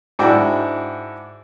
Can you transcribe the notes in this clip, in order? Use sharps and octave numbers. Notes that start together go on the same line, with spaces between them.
G#2 D4 E4 F#4 G5